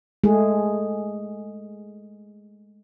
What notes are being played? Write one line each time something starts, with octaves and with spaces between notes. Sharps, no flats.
G#3 A3 G#4